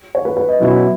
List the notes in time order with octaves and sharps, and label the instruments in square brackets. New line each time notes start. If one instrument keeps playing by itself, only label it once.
[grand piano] C#5
B4
B4
D#5
[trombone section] B2 F#3 C#4 E4